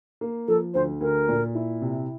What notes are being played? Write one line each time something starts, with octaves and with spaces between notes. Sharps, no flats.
A#3
F3 A4
D2 C5
D2 A#4
A#2
E4
C3